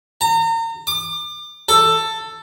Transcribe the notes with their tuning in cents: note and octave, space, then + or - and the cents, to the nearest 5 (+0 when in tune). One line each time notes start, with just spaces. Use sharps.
A#5 -35
D6 +35
A4 +10